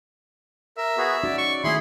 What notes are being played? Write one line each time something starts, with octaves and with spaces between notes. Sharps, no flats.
A#4 E5
B3 F#4 G#4
C#4 D#4 F#4 D5
C#6
D#3 A3 E4 G#4 B5 C6